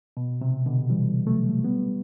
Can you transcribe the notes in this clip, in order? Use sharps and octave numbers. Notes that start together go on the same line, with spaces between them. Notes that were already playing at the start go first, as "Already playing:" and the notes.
B2
C3
B2 D3
E3 G3
F#3 A3
G3 B3